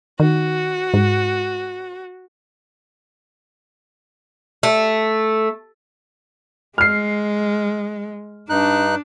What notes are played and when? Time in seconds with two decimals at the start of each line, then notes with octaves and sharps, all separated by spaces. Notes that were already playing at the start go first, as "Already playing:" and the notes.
0.20 D#3 F#4
0.94 G#2
4.63 A3
6.78 G#3 F6 C7
8.49 G2 D4 D#4 F#6